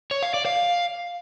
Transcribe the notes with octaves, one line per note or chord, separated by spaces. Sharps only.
C#5
F5
D5
F5